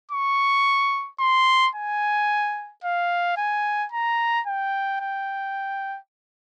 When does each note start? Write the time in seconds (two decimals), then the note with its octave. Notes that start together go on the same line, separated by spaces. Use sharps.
0.11 C#6
1.20 C6
1.75 G#5
2.84 F5
3.37 G#5
3.92 A#5
4.47 G5
5.00 G5